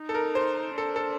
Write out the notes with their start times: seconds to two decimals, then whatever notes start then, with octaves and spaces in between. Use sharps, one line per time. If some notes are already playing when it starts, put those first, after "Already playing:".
Already playing: D#4
0.09 A4
0.14 A#4
0.35 C5
0.78 D4 A4
0.96 A4